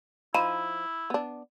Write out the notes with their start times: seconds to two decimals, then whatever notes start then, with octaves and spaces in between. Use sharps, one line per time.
0.35 F3 D#4 E4 B5 D#7
1.10 B3 D4